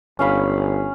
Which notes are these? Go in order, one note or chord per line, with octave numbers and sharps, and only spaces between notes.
G1 C#4 F5 B5